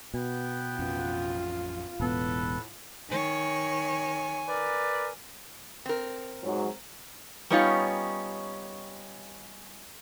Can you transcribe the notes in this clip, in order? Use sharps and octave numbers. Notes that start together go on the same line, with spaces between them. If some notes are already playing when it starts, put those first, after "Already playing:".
B2 B3 F#5 G5
A1 F2 C#4 F4
E1 A2 B3 A4 B4
D#3 C#5 G#5
A#4 B4 D5
C4 A#4
G#2 F#3
G3 B3 C#4 D#4 F4 C#5